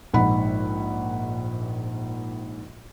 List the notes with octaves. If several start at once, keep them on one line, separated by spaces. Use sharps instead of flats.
A#1 G#2 F#5 B5